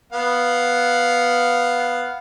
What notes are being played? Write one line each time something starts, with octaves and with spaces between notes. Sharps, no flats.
B3 F5 F#5